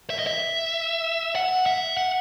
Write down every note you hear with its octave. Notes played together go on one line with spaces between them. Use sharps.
E5
D#5
E5
F#5
E5
F#5